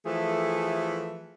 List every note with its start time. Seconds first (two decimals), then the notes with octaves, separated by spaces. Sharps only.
0.05 E3 F3 A3 G#4 A4